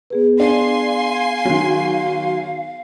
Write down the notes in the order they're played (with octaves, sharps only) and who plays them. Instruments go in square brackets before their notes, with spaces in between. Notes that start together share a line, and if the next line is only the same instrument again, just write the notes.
[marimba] B3 G#4 B4
[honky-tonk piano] D4 [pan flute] F5 [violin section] G#5 C6
[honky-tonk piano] D#3 F#3